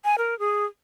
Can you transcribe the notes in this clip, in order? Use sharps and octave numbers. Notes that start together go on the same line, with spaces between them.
G#5
A#4
G#4